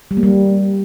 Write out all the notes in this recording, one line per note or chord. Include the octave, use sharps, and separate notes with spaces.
G3
A#3
G3